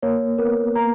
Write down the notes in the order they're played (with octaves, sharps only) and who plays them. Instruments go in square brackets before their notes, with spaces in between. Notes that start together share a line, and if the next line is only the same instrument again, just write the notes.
[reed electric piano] A#3 [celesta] C#5
[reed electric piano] B3 [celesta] A#4
[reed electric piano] A#3 [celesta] A#5